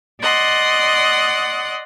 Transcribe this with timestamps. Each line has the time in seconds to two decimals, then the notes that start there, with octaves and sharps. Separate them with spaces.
0.21 D5 D#5 F#5 C6